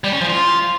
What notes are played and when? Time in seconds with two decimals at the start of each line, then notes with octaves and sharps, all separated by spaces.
0.04 G3
0.12 C#4
0.21 F3
0.29 F4